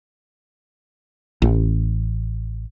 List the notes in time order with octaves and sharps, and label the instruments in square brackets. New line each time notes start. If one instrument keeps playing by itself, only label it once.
[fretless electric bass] A1